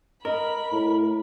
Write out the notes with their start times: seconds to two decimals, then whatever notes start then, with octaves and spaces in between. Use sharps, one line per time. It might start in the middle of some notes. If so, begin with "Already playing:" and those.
0.25 A#4 D#5 B5
0.72 A2